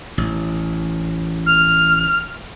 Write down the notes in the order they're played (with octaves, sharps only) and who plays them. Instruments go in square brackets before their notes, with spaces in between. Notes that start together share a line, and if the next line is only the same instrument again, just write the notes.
[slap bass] A1
[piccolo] F6